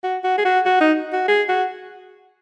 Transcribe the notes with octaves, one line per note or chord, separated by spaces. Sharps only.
F#4
F#4
G#4
F#4
F#4
D#4
F#4
G#4
F#4